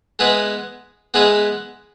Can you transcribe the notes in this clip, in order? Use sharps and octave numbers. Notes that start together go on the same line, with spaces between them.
G#3 B3 E4 G#4 B4
G#3 B3 E4 G#4 B4